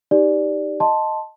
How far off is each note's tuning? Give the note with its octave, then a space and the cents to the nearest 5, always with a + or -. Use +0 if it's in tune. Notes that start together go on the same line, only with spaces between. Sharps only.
D#4 +0 G4 +5 D5 +0
D#5 +0 A5 +0 C6 +5